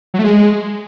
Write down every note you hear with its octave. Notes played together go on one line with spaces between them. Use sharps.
F#3
A3
G#3